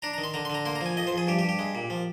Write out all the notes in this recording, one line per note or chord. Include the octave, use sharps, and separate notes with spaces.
D4 A#5
A#5
D#3
C6
D3 A#5
C6
D3 A#5
A#3 C6
A#5
F3 G#5
F2 D#5
C5
F2
G#4
G2 G4
G4
G2
G4
G#3
A#2
F3